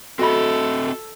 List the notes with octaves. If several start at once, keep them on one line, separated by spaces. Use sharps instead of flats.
C4 F#4 A4 D#5 E5 B5